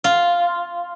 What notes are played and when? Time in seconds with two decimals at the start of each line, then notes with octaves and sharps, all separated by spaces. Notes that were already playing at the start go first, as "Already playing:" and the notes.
0.04 F4